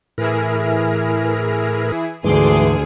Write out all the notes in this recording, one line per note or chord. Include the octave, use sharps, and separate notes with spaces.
A2 E3 E4 G#4 A#4
D2 G#2 E3 G#4 C6 D6